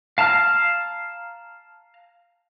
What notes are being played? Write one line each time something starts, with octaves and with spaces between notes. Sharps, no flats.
F5 A5 A#5 F6